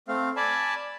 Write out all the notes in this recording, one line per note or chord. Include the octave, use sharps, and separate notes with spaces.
A3 C4 F5
D5 G#5 A5 B5